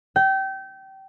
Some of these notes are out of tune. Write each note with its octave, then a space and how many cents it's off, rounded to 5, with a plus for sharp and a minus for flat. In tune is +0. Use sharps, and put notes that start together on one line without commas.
G5 -25